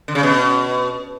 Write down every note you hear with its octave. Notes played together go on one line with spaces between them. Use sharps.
D3
C#3
B2